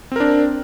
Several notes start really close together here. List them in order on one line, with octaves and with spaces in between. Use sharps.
C4 A#4 D4